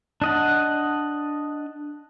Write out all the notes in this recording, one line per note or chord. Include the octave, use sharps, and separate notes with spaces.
D4 D#5 F#5